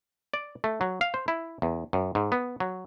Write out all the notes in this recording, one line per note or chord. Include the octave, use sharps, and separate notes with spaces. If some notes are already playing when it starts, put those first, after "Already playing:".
D5
A3
F#3
F5
C5
E4
E2
F#2
G#2
B3
F#3